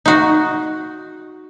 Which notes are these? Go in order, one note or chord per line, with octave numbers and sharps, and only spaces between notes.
D#4 F#4